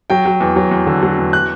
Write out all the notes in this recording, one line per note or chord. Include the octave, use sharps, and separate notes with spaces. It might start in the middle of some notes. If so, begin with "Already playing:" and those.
F#3 G5
F#3
E2
F#3
E2
D3
F#3
E2
F#6